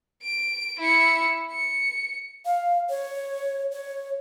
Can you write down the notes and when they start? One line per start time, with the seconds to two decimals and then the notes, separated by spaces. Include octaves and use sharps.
0.23 D7
0.79 E4 C#7
1.51 C#7
2.46 F5
2.90 C#5
3.72 C#5